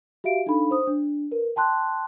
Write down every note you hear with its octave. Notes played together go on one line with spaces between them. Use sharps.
F#4 G4 E5 F5 D7
D4 D#4 A4 F5 B5
C5 D#6
D4
A#4 B4
G5 A5 C6 F#6